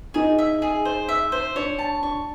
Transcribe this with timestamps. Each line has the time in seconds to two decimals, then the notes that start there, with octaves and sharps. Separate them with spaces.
0.14 D#4 G#4
0.38 E5
0.62 G#4
0.85 C5
1.09 E5
1.32 C5
1.56 D4 C#5
1.79 A5
2.02 D4 C#6